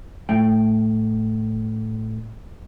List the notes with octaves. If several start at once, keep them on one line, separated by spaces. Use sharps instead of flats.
A2 A3 G5